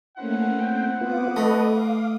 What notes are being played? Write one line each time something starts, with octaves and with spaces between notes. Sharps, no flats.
A3 A#3 C#4 E4 C5 F#5
C4 G5
B3 F4 D6 D#6
A3 A4 B4 D#5
F5